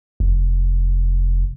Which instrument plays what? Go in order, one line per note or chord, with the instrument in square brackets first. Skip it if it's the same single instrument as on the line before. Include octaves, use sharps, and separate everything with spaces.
[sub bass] F1